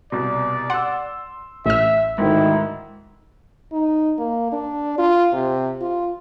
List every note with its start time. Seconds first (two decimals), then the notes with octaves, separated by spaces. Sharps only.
0.12 C2 B2 D5
0.70 F#5 C6 E6
1.66 A1 E5 F6
2.18 D2 G#2 D#3 E4
3.72 D#4
4.19 A#3
4.52 D4
4.98 F4
5.33 C3
5.81 F4